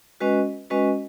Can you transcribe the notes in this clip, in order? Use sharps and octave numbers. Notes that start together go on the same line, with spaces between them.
G#3 C#4 F#4 B4 D#5
G#3 C#4 F#4 B4 D#5